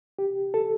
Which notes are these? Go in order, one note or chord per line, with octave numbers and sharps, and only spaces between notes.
G4
A4